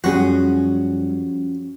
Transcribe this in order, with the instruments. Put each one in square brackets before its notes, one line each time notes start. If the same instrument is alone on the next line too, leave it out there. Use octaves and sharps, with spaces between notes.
[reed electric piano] F#2 G3 [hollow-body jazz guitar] F3 C#4 G#4 [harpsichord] F#4